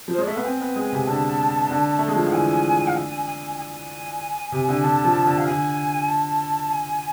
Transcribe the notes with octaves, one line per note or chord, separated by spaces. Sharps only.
F3
C5
G#3 D5
A3 E5
B3 F5
C4 G#5
B3
G#3
C3
D3 A5
D3
A3
G#3
F3
E3 F5
D3 G#5
F5
G#5
G#5
G#5
C3
D3
D3 A5
F3
D3
F5
D3 G#5
A5
G#5